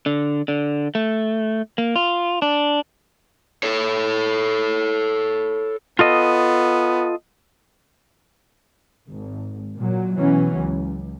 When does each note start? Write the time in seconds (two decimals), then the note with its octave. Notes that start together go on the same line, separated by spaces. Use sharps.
0.06 D3
0.48 D3
0.95 A3
1.78 A#3
1.96 F4
2.42 D4
3.63 A4 C#5
5.99 B3 F4 A4 D#5
9.09 G#1
9.77 A#2 F#3
10.17 B2 E3 F#3 C#4
10.57 C#2